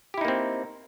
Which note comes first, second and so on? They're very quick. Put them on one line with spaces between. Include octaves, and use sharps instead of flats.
G4 E4 D#4 A#3 C4